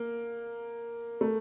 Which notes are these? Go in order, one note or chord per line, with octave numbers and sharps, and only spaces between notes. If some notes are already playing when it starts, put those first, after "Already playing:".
Already playing: A#3
A3